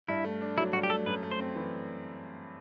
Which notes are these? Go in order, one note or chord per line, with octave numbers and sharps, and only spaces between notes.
G2 E4
A3
D4
F#3 E4
G2 F#4
G4
A3 A4
F#2 B4
A3
C5
C4
E3